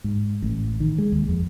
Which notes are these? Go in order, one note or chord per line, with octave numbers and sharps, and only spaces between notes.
G#2
A1
D#3
G#3
D#2
F2